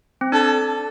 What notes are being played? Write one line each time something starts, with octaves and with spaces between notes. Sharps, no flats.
C4
D4 A4